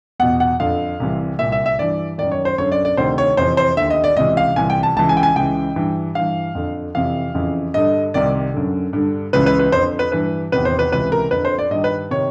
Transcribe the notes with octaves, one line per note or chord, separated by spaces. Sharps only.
E2 B2 F#5
F#5
F2 D3 F5
C2 C3 E3
C2 A#2 E5
E5
E5
G2 E3 D5
F#2 D#3 D5
C#5
C5
F#2 D3 C#5
D5
D5
D2 C3 D#3 C5
C#5
F2 C3 E3 C5
C5
D#2 D3 E5
D#5
D5
C#2 C3 E3 D#5
F5
C2 C3 E3 G#5
G5
A5
C#2 C#3 E3 A5
G#5
G5
G#5
C#2 C#3 E3 G5
G2 E3
G2 E3 F5
F2 D3
F2 C3 E3 F5
F2 C#3 E3
G2 D3 D#5
C2 C3 D#3 D5
F#2 D3
G2 D3
C#2 C#3 E3 B4
B4
B4
F2 D3 C5
B4
G2 E3 B4
E2 C3 D#3 B4
C5
B4
C#2 C3 E3 B4
A#4
F2 D3 B4
C5
D5
G2 D#3 D#5
B4
C3 D#3 C#5